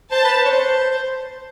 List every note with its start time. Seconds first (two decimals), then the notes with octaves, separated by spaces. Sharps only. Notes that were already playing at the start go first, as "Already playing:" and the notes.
0.11 C5 A5
0.25 B4
0.38 C5
0.45 C#5
0.51 C5
0.90 C5